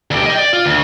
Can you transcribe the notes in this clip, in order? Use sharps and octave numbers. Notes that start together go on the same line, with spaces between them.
D2 G4
D#5 G5
D5
F4
D2